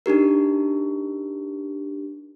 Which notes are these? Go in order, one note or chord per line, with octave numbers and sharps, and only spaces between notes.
D4 D#4 G4 A#4